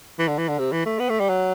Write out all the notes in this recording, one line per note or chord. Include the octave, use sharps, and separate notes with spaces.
E3
D3
E3
D3
C3
E3
A3
B3
A3
G3
F#3